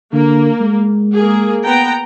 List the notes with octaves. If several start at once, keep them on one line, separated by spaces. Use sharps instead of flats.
D3 A#3
G#3
A#3 G#4
B3 G5 A#5